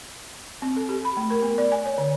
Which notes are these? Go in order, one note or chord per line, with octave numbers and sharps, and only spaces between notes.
C4
A4
G4
B5
A3
A#4
B3
D5
G#5
C#5
D3